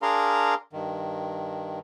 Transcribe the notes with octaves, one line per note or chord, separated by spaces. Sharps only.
D4 G#4 A#4 F5 A#5 C6
G2 D#3